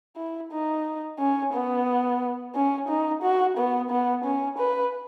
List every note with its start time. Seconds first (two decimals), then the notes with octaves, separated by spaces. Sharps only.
0.17 E4
0.52 D#4
1.20 C#4
1.54 B3
2.55 C#4
2.88 D#4
3.23 F#4
3.57 B3
3.91 B3
4.24 C#4
4.59 B4